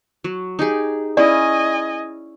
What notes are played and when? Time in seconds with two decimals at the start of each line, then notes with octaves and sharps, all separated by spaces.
0.24 F#3
0.59 D#4 G4 G#4
1.17 C#4 E4 G#4 D5 D#5 G#5